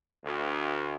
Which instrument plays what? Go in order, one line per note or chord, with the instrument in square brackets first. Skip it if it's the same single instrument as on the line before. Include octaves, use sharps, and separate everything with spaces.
[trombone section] D2